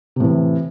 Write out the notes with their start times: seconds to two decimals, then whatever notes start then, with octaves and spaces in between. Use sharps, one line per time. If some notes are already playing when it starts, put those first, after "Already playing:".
0.16 C3
0.20 A2
0.24 E3